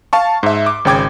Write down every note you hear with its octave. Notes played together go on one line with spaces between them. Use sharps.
F5 A5 C#6
G#2 E5
D6
G#1 C#3 G5 D6 G#6